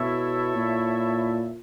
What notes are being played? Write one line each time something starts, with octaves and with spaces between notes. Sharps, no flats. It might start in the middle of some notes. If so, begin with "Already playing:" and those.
Already playing: B2 E4 A4 C#5 E5
A#2